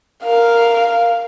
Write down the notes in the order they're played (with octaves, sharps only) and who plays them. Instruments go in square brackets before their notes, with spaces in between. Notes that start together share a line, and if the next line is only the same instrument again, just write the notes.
[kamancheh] A#4 F5